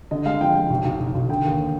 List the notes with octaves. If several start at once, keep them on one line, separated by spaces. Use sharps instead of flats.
D3 D#5
G#3 F5
F3 G5
G#3 G5
B1
B1
B1
B1
D3 G5
D#2